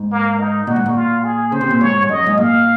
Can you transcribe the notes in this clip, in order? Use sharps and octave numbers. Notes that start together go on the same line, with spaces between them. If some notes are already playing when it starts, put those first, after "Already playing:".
Already playing: G#2
A#3
D#4
A#2 F#4
G#2
A#2
F4
G#4
C#3 C5
C3
A#2
G#2 C#5
G#2
F#2 D#5
G#2
A#2 F5